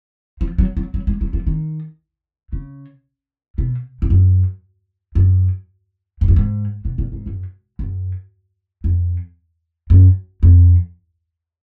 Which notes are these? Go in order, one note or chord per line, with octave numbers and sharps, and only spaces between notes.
F3
F#3
F#3
F#3
G#3
F#3
F3
D#3
C#3
B2
G#2
F#2
F#2
G#2
F#2
G#2
B2
A#2
G#2
F#2
F#2
F2
F#2
F2